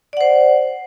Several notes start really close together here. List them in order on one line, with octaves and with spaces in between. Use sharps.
D5 F#5 C5